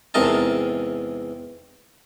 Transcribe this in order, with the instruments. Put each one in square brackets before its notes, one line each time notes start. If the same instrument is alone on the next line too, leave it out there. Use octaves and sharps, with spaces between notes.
[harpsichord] E2 G#2 C3 A#4 D#5 A5